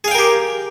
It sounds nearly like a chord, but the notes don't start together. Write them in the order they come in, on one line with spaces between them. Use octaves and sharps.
G#4 F5 G5 A#4 G4